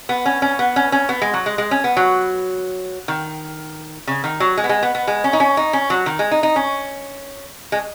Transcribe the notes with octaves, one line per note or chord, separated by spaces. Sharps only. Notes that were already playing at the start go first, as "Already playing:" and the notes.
B3
C#4
C#4
B3
C#4
C#4
B3
G#3
F#3
G#3
G#3
C#4
B3
F#3
D#3
C#3
D#3
F#3
G#3
B3
G#3
B3
B3
G#3
C#4
D#4
C#4
D#4
C#4
F#3
D#3
G#3
D#4
D#4
C#4
G#3